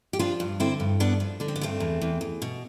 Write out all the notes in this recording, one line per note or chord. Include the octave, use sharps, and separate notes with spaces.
G4
F3 D4 F4
G2
D3 C4 E4
G2
G2 B3 D4
F3
D3 D4
C4
B3
G2 A3 C4
E2
E2
E2
B2